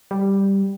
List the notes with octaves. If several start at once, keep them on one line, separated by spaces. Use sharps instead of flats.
G3